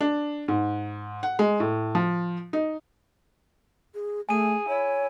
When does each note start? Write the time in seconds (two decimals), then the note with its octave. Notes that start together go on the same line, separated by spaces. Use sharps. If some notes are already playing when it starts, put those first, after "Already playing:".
0.01 D4
0.48 G#2
1.23 F#5
1.39 G#3
1.60 A2
1.95 F3
2.53 D#4
3.94 G#4
4.29 A3 G#4 G#5 D#7
4.68 E4 C#5